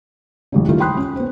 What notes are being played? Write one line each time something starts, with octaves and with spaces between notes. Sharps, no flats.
A1 F#2 C#3
D#3 F#3 G3 A3 E4 F4
G5 B5 C6 D#6 F#6
C#4
B3 C5